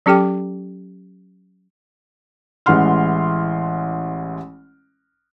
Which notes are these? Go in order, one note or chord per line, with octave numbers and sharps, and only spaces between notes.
F#3 C#4 G4 A4 G5 D6
A1 E3 G#3 F#5 C6 F6